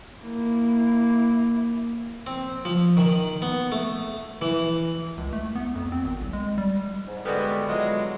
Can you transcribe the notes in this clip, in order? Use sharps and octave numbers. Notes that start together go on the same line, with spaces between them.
A#3 E4
C4
F3
D#3
B3
A3
E3
C#2
A3
B3
F2
C4
G#1
C2
G#3
G3
G#2
D3 G3 G#3 B3 F#4
F#3 G#3 B3 E4 F4